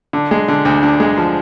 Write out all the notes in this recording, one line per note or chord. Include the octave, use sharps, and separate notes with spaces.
D3
G#3
D3
D2
D3
G#3
F3